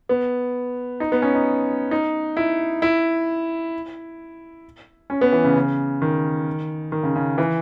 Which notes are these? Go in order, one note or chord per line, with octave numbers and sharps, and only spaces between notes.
B3
D#4
B3
C#4
D#4
D#4
E4
E4
C#4
B3
E3
C#3
C#3
D#3
D#3
C#3
C#3
E3